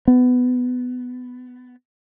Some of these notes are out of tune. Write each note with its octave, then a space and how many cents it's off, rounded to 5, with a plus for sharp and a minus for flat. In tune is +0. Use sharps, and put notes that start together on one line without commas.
B3 +15